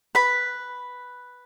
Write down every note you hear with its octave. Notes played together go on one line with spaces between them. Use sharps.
B4 B5